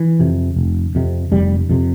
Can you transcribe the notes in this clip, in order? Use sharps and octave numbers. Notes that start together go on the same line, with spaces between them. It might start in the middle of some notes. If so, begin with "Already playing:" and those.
Already playing: E3
F2 C3
F1
F2 C3
F1 G3
F2 C3